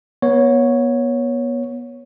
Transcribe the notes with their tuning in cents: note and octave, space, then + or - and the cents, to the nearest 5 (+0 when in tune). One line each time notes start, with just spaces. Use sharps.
B3 -30 C#5 +0